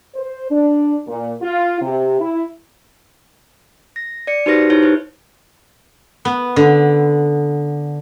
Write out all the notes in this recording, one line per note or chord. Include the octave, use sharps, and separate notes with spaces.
C5
D4
A#2
F4
C3
E4
A#6
D5 C#7
D#4 F#4 G4 B4 C5 A#6
D#4 E4 G4 C#5
E4 B4 C5
B3
D3